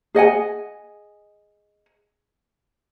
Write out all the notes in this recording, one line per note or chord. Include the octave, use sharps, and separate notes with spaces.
G#4 D#5 F#5 G#5